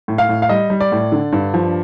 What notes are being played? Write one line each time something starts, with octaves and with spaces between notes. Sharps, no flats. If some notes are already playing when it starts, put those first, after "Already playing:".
A2
F5
A2
F5
G3 D#5
G3
D5
A2
D3
G2
F3